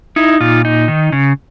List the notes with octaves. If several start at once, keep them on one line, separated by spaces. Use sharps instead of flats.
D#4 E4
A#2 F4
D#4
D#3
C#3